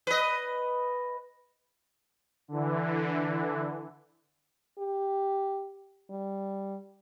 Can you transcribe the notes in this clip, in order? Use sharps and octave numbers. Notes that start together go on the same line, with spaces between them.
B4 D#5
D3 E3
G4
G3